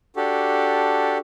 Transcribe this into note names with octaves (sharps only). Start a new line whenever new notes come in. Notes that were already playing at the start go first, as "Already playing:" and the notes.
D4 F#4 G4 A4